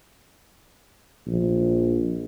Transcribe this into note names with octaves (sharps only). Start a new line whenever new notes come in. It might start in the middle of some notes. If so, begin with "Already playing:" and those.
A#1